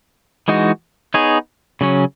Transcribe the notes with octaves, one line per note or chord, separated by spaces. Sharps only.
E3 G#3 D#4 F#4
B3 D#4 G#4 C#5
C#3 F#3 C#4